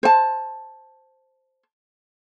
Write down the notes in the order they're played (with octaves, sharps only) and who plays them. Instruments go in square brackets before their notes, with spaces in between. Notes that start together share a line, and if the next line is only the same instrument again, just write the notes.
[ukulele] C5 A5